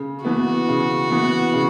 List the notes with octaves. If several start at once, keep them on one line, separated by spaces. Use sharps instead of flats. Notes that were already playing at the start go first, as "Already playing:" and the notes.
Already playing: C#3
E3 B3 F#4
C#3
E3 B3
C#3